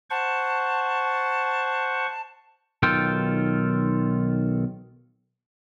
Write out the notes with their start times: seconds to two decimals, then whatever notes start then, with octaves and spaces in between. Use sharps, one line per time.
0.10 C5 F#5 A5 C#6
2.83 B1 D#3 F4 A4 G5